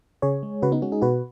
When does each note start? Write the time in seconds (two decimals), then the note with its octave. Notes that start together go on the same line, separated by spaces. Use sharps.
0.22 C#3 G#4 C#5
0.43 G#3
0.62 C#3 F#4 B4
0.72 B3 D#4
0.82 G#3 C#4 F#4
0.92 D#4 G#4
1.02 B2 F#4 B4